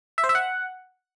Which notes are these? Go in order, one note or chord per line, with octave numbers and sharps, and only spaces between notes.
E5
C5
E5
F#5